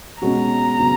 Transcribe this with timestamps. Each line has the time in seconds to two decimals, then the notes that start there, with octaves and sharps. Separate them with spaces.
0.22 B2 G#3 C#4 F#4 A#5
0.79 C#3 F#3 B3